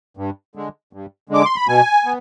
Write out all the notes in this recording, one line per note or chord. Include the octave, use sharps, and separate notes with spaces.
G2
D3 G#3
G2
D3 G#3 D6
C6
B5
B2 G#5
B3